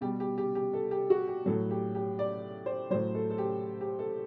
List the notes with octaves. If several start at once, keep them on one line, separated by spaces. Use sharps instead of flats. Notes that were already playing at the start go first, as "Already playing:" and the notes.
B2 G3 G4
G4
G4
G4
A4
G4
F#4
G4
A2 F#3 A4
G4
G4
D5
C5
A2 F#3 C5
A4
A4
G4
G4
A4